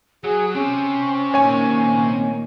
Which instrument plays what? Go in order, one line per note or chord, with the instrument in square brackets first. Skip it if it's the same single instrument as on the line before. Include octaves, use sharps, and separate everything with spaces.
[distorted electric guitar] F#3 [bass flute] G#4
[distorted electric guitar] C4 G4 [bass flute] C#4
[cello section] A#2 D#3 A#3 [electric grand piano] C#5 G#5